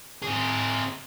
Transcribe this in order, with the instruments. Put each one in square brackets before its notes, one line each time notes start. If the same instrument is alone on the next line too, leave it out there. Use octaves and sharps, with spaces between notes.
[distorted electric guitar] C4 G#4